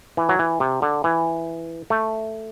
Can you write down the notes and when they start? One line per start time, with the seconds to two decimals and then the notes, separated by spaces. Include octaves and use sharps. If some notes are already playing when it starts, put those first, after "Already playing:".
0.17 E3
0.29 F#3
0.39 E3
0.60 C3
0.82 D3
1.04 E3
1.90 A3